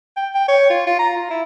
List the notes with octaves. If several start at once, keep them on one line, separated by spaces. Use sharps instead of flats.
G5
G5
C#5
F4
F4
A#5
F4
E4